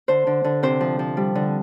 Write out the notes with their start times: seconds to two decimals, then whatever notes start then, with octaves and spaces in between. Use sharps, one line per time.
0.08 D3 C5
0.27 D3
0.44 D3
0.63 C3 C5
0.81 F3
0.99 F3
1.17 G3
1.35 D3